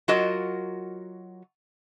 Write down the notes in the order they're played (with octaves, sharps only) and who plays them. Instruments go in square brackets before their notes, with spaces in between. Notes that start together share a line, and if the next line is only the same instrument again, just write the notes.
[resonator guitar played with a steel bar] F#3 F4 F#4 A#4 D#5